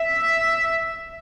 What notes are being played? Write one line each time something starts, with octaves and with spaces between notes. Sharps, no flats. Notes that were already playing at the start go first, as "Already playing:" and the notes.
Already playing: E5